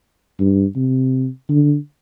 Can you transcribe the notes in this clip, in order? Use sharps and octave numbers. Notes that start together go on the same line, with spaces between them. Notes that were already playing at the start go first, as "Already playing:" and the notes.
G2
C3
D3